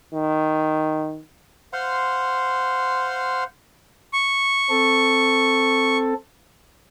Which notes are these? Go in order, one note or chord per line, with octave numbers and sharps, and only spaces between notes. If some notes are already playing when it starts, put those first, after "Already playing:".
D#3
C5 F5 F#5 C6
C#6
C4 A4